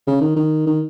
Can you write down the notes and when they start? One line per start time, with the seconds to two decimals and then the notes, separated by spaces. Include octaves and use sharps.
0.07 C#3
0.21 D#3
0.36 D#3
0.67 D#3